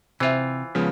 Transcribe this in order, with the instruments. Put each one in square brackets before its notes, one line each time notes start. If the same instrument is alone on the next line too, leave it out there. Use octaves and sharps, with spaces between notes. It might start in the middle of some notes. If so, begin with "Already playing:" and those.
[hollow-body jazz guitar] C3 [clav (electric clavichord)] E3 F4 [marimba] C5 E5
[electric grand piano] C#3 F3 B3 [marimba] G#3